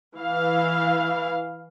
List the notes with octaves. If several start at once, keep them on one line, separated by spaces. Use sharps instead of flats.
E3 F5